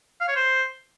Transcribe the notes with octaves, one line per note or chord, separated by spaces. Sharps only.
F5
C#5
C5